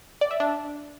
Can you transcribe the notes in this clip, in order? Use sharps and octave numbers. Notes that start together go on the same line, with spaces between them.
D5
E5
D4